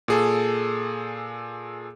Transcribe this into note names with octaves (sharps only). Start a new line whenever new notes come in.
A#2 G#4 A4